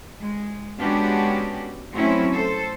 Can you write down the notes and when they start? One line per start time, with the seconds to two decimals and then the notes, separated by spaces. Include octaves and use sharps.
0.21 G#3
0.80 G#3 B3 C#4 D4 F#4 G4
1.93 F#3 A3 C4 C#4 E4
2.33 A4 C5